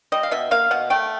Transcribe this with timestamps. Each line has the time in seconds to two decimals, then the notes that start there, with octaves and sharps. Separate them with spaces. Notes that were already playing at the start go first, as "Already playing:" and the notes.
0.12 G3 D#5
0.23 F5
0.31 B2 E5
0.51 A#3 F5
0.71 B2 F#5
0.90 A3 G5